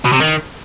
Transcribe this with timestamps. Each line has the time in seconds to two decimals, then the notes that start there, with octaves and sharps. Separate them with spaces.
0.05 B2
0.13 C3
0.21 D#3